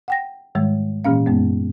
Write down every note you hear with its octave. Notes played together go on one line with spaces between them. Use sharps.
F#5 G5 A#6
G#2 D#3 G3 G#3
A#2 E3 A#3 C#4 F5
F#2 G#3 B3